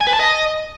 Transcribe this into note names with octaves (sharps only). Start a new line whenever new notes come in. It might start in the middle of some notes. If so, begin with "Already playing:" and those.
G#5
B4
A5
D#5